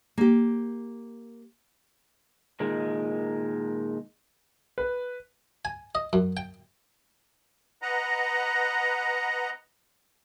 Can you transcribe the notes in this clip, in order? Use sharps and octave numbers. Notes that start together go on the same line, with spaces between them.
A#3 G4
A#2 D#3 G#3
B4
G#5
D#5
F#2
G5
B4 D#5 F#5 A#5